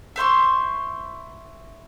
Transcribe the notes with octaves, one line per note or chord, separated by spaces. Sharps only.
E4 C5 C6 C#6